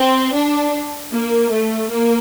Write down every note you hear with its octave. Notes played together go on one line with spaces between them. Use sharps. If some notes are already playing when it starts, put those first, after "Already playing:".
Already playing: C4
D4
A#3
A3
A#3